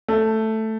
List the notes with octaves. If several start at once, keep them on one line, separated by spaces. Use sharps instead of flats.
A3